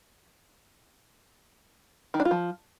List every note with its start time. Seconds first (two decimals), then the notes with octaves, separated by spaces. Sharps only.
2.14 D#3
2.20 D4
2.25 F4
2.31 F3